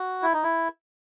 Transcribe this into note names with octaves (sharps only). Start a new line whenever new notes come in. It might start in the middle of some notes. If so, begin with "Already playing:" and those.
Already playing: F#4
E4
D#4
E4